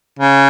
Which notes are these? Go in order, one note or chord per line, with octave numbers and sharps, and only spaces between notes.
C#3